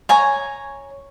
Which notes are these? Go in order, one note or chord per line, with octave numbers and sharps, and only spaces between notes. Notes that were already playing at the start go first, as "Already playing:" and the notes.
C#5 G#5 A#5